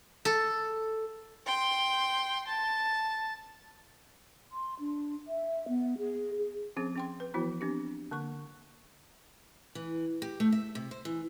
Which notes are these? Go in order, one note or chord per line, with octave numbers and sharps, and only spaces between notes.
A4
G5 C6
A5
C6
D4
E5
B3
G#4
G#4
F3 C4 C#4 G#4
C#4 G5 C6
B4
E3 F3 B3 E4 F#4
C4 D4 G4
D3 A#3 C#6
E3
G4
A3
E5
C3
C5
E3